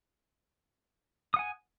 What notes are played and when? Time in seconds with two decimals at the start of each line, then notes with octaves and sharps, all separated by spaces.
1.34 D#6
1.36 F#5
1.39 G#5